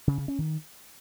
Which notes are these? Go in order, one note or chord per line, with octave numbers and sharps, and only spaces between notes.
C#3
C#3
C#4
D#3